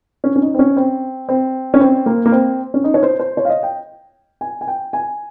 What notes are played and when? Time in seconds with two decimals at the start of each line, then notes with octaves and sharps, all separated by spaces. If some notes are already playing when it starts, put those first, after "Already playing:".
0.24 C#4
0.36 C#4
0.42 D#4
0.54 C4
0.59 C#4
0.77 C4
1.29 C4
1.74 C#4
1.80 C4
2.06 A#3
2.26 A#3
2.32 C4
2.74 C#4
2.84 D#4
2.94 C#5
3.03 C5
3.20 C5
3.37 C#5
3.45 F5
3.49 D#5
3.63 G5
4.41 G#5
4.61 G#5
4.68 G5
4.93 G#5